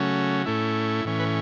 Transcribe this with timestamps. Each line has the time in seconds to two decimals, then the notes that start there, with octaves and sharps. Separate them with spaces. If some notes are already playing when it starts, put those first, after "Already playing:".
Already playing: C#3 F#3 A3 C#4
0.45 A2 A3 C#4 E4
1.05 A2 E3 C#4
1.20 B4